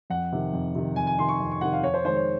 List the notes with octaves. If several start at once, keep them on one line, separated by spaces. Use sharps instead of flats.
F2 F#5
C3 D#3
F2
C3 D#3
F2 G#5
G#5
C3 D#3 C6
C#6
F2
C#6
C3 D#3 F#5
F5
F2 C#5
C5
D#3 G#3 C5
C#5